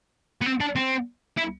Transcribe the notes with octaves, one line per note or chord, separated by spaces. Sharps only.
B3
C4
D4
C4
E4